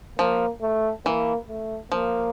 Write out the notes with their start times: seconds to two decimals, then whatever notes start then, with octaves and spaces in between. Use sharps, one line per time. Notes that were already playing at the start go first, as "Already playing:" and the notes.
0.19 F3 A#3
0.62 A3
1.06 E3 A#3
1.49 A3
1.92 F3 A#3